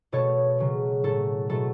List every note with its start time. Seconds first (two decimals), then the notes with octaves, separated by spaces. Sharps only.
0.12 B2 A3 A4 C#5
0.58 C#3 F#3 A3
1.03 A2 F#3 A3 A4
1.50 B2 F#3 A3 A4